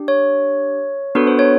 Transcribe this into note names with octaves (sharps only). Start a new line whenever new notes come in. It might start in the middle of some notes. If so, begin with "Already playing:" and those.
Already playing: D4 G4
C#5
B3 D4 F#4 A4 B4
C5
C#5